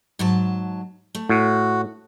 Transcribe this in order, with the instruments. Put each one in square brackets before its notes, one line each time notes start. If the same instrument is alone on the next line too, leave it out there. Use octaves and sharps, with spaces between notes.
[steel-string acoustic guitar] G#2 F#3 A5
A3
[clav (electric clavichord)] A2 [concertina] F#4